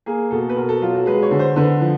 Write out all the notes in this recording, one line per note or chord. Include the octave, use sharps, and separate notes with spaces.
A#3 G#4
B2 A4
B4
B2 A#4
A4
F#3 F4
F#4
G#3 B4
C#5
D3
C5
D3 B4
F3